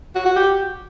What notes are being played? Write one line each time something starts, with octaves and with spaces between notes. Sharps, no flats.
F#4
F#4
G4